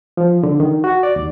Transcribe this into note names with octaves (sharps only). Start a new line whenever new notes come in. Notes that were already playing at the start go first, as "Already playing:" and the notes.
F3
D3
D#3
F#4
D5
D#2